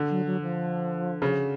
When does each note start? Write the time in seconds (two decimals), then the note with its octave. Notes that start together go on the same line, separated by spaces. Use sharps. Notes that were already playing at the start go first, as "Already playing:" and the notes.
Already playing: D3
0.10 F#3
0.26 F#3
0.42 F3
1.22 C#3